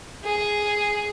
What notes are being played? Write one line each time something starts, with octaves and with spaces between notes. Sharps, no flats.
G#4